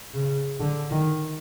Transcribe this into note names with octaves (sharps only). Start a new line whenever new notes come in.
C#3
D3
D#3